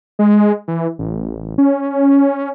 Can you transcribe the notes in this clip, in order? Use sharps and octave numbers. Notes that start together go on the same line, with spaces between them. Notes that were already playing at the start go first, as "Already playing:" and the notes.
G#3
E3
A1
C#4